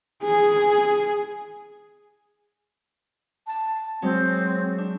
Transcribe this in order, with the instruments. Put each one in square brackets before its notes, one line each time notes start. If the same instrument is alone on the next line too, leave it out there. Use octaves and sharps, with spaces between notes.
[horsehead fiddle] G#4
[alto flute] A5
[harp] F#3 G#3 [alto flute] C4
[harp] D4